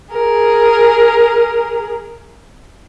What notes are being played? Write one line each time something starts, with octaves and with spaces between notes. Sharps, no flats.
G#4 A#4